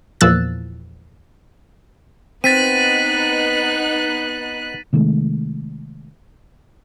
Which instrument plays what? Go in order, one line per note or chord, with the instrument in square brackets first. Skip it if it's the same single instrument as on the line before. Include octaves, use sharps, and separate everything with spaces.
[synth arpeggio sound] E2 A#2 F3 E6 F#6 A6
[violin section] B3 D#4 F#6 [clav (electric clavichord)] C4 [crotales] A6 B6 D#7
[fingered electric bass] C3 D#3 G#3 A3